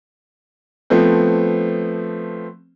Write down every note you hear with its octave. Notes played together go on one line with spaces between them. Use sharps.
F3 A3 B3 C4